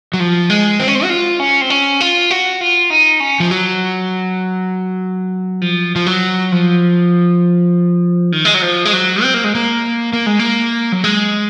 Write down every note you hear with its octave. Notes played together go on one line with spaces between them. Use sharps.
F#3
F3
G#3
C4
C#4
C4
F#4
F4
C#4
C4
C#4
F4
F#4
F4
D#4
C#4
F3
F#3
F3
F3
F#3
F3
D#3
G#3
F#3
F3
G#3
F#3
C4
A#3
G#3
A#3
A#3
G#3
A#3
F#3
G#3